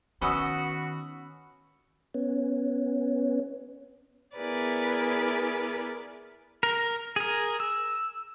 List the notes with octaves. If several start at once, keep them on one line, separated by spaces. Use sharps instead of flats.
D#3 B3 C#4 F#4 D#5 B5 D#6 E6
B3 C#4
B3 E4 G#4 A#4 B4 D5
A#4
G#4 A#4
E6